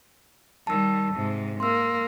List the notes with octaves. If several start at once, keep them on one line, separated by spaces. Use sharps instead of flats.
D#3 G3 A5 E6
G#2 C3
A#3 C6 E6